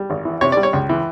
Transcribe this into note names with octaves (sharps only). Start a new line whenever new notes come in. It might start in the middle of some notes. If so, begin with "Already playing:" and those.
Already playing: G3
G#1
E3
C3 C#5
G3 D5
C#5
C#2
E3